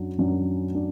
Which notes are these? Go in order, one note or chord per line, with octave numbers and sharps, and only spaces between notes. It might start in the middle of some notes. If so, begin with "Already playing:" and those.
Already playing: F#2 F#3 D4
F#2 F#3 D4
D4